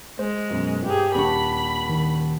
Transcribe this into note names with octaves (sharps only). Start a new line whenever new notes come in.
G#3 C5
F#2 B2
G2 G4 G#4
D#1 D4 B5 C#6
D#3